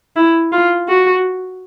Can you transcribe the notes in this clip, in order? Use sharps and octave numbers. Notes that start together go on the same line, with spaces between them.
E4
F4
F#4